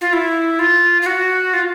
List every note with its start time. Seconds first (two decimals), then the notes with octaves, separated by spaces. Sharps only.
0.01 F4
0.13 E4
0.59 F4
1.02 F4
1.06 F#4
1.53 F4